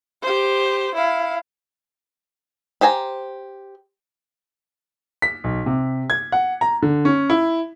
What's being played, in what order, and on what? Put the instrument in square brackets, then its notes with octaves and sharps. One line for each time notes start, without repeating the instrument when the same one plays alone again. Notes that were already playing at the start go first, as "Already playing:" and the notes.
[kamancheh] G4 C5
E4 F5
[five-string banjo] G4 C5 G#5 A#5
[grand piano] B6
B1
C3
G#6
F#5
A#5
D3
C#4
E4